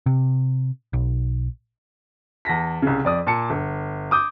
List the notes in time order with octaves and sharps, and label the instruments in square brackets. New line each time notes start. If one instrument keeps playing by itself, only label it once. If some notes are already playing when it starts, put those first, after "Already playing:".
[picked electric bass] C3
B1
[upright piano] E2 A5 A#6 B6
C2 C#3
F2 D5 D#6
A#2 A5 C#7
G1
D6 D#6 G6